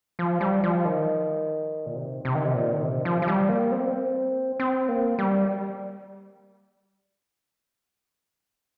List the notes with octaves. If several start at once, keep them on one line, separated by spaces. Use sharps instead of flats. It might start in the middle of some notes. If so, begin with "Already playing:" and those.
F3
G3
F3
D#3
A#2
C3
C3
D#3
C3
A#2
D#3
C3
F3
F3
G3
A#3
C4
A#3
C4
C4
A#3
G3